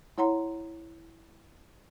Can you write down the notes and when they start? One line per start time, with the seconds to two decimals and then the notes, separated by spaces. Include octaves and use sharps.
0.18 E4 C#5 F#5 A#5 C6